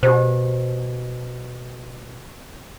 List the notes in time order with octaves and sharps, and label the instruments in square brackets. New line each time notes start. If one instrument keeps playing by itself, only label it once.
[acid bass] B2 [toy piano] G4 C5